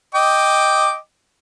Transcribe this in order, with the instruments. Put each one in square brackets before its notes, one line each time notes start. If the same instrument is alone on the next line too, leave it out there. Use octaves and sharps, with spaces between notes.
[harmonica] D#5 G5 D6